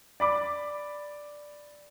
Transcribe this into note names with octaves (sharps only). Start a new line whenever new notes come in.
D5 B5 D6